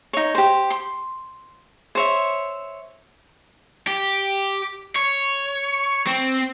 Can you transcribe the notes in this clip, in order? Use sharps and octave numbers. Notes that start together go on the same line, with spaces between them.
D#4 C#5
G4 C5
C6
C5 C#5 E5
G4
C#5
C4